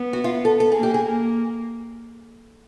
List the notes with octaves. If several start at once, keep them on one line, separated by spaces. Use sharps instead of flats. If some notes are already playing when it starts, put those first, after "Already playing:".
Already playing: B3
F#4
F4
A4
A4
A#3 G#4
G4
G#4
A#3